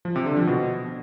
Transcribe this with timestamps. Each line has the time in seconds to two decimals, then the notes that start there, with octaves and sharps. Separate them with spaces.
0.05 F3
0.16 C3
0.26 D3
0.37 F3
0.47 B2